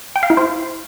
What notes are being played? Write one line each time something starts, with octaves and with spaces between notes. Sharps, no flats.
G5
F5
E4
C5